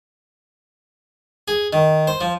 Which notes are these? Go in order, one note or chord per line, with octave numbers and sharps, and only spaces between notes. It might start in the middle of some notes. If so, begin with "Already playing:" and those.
G#4
D#3
C5
F3